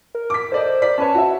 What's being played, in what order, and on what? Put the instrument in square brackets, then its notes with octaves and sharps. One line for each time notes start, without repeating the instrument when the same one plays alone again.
[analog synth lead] A#4
[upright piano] D6 B6
[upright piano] A4 D5 D#5 [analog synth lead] C5
[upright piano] A#4 D5 B6
[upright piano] C#4 B4 C#5 [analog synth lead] A5
[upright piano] F#4 E5